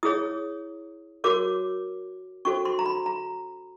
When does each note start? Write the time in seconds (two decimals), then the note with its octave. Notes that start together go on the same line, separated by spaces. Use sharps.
0.03 E4 G#4 C#5 D#6
1.24 F#4 A#4 C#5 D6
2.45 C#4 F#4 A4 C5 C#6
2.65 C6
2.79 A#5
2.86 B5
3.06 A#5